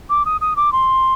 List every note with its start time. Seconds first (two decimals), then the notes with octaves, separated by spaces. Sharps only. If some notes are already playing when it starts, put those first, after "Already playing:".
0.10 D6
0.25 D#6
0.41 D#6
0.56 D6
0.72 C6